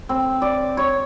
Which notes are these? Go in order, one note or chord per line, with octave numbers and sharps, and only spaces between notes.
C4
D5
C#5